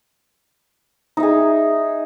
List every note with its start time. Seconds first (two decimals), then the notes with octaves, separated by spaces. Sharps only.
1.17 D#4
1.20 E5
1.23 G#4